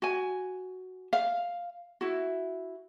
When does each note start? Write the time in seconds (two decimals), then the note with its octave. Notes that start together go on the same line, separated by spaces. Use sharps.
0.02 F#4 G#5
1.13 F5
2.01 E4 F#4